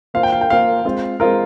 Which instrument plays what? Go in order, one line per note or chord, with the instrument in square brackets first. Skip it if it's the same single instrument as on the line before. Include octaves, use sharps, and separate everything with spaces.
[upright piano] A#3 F4 C5 [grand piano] F5
[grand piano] G5
F5
G5
[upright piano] A#3 F4 C5 [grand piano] F5
[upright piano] G#3 C4 F4 C5
[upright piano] G#3 C4 F4 C5 [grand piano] A#4